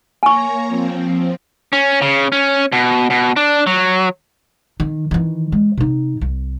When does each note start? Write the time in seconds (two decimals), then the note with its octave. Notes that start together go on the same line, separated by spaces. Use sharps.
0.23 A#3 C#5 G#5 A#5 C#6
0.67 F3 C4
1.73 C#4
2.02 C#3
2.32 C#4
2.72 B2
3.10 B2
3.36 D4
3.67 F#3
4.80 D#3
5.11 D#3 E3
5.52 G#3
5.77 C3 D#4
6.21 C2